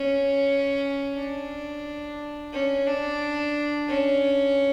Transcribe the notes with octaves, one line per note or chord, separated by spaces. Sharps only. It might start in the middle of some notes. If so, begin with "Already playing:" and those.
Already playing: C#4
D4
C#4
D4
C#4